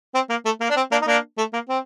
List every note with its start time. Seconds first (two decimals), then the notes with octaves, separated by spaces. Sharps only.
0.14 C4
0.30 A#3
0.45 A3
0.61 A#3
0.70 D4
0.76 C4
0.91 A#3 D4
1.01 D#4
1.07 A#3 D4
1.38 A3
1.53 A#3
1.69 C4